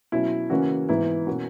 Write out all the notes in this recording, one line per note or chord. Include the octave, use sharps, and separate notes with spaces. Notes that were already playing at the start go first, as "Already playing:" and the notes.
B2 F#3 C#4 E4
C#3 E3 A#3 C#4 F#4
G#2 E3 B3 E4
B2 A#3 C#4 F#4